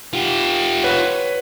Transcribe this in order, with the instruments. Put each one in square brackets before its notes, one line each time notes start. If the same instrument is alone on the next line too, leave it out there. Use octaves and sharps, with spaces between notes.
[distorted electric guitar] F4 G4
[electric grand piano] B4 C#5 F#5